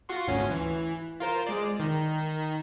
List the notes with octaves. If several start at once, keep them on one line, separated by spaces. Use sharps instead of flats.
F4 F#4 C6
G#1 D2 C#4
E3
F4 A#4 C5
G#3 D5
D#3